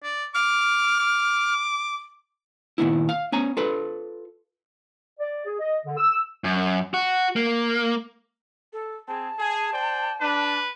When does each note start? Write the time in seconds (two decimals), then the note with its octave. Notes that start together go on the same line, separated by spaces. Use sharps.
0.03 D5
0.35 D6 F6
0.99 D6
2.78 A#2 D#3 B3 E4
3.09 F5
3.32 B3 C#4 G#5 A#5
3.57 F4 A4 B4
5.20 D5
5.46 G#4
5.59 D#5
5.86 D3
5.97 E6
6.44 F#2
6.94 F#4
7.36 A#3
8.73 A4
9.08 C4 G#4 A5
9.39 G#4
9.72 C5 D5 G5
10.21 D4 B4